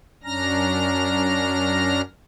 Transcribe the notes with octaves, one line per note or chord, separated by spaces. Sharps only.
F#2 C#4 D4 A#5 F6 A#6